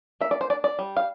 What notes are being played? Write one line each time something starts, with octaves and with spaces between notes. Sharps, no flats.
A#3 E5
D5
C5
D4 D5
D5
G3
F5